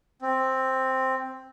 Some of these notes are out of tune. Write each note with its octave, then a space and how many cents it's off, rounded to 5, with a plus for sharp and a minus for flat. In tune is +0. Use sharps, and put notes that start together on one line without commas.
C4 +5